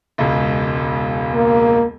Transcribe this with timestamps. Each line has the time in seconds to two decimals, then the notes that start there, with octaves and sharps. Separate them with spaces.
0.18 E1 C#2
1.34 A#3